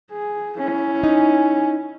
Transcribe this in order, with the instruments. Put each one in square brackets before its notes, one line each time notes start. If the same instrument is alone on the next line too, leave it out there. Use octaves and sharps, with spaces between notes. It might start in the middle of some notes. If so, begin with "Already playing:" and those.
[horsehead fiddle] G#4
C#4 E4
[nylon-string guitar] D#4